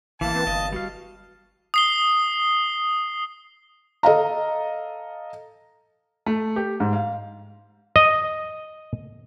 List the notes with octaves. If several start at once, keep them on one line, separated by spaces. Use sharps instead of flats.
A1 E3 A#3 F5 A5
C4 B4
G1 D#5 F5
G3 F#4 F5
D#6 C7 G7
A4 D#5 F5 A#5
A3
G4
G#2
F5
D#5